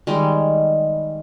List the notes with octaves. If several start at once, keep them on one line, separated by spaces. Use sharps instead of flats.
D#3 G3 G#3